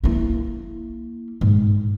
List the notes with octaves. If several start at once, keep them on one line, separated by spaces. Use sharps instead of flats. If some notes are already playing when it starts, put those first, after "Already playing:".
A#3 E4
G#2